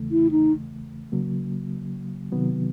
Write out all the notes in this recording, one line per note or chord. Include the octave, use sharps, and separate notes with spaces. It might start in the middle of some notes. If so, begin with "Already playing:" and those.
Already playing: E2 C#3 E3 A3
E4
D#4
C#3 F#3 A#3
C3 D#3 F#3 B3